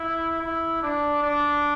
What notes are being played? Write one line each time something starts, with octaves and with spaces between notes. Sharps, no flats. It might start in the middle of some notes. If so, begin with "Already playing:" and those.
Already playing: E4
E4
D4
D4